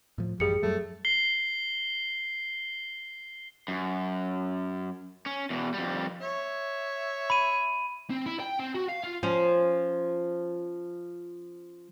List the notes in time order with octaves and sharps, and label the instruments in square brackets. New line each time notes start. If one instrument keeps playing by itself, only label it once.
[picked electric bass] A2 F3
[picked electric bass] A1 F#2 [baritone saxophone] G3 [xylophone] G#4 C#7
[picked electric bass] F#2 F#3 G3 [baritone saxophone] A3
[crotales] C7 G7
[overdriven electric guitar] F#2
C#4
E2 B2
F2 G3
[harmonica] C#5 E5
[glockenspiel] B5 D#7
[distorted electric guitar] C4
E4
G5
C4
F#4
F5
F4
[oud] F3 C#4